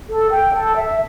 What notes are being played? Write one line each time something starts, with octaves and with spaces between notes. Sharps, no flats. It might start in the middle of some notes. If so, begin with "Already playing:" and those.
A4
G5
A4
E5